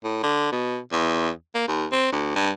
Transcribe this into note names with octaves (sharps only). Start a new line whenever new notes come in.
A2
D3
B2
E2
A#3
D#2
C4
D2
G2